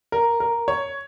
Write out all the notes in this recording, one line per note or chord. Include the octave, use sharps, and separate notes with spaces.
A#4
A#4
C#5